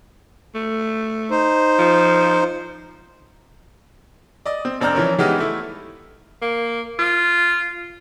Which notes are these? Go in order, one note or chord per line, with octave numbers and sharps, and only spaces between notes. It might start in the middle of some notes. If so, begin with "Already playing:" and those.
A3
D#4 C5
F3
D5 D#5 D#6
C4
F1 C4 D4 A#5 F6 G6
E3 F3 C#4 A#4
E3 G#3 B3 D#4 G4 F6
A3 E4
A#3
F4